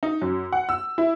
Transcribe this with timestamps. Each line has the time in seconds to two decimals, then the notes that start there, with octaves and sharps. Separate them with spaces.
0.03 D#4
0.22 F#2
0.53 F#5
0.69 E6
0.98 E4